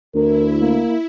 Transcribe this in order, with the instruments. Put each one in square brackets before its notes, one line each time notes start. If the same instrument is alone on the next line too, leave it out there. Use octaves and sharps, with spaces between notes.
[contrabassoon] D2 [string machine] E4 [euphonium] A#4
[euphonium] A#3